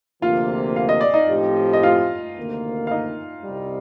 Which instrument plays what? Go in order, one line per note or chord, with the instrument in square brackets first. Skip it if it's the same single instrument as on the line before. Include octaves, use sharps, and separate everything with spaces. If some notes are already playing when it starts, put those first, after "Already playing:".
[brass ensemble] D2 C3 F3 A#3 [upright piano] F4 F5
[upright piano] F5
D#5
D5
D#4 D#5
[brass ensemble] A2 F3 C4 G4
[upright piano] D#5
F4 F5
[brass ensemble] D2 C3 D#3 A#3
[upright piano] F5
D#4 D#5
[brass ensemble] C2 C3 G3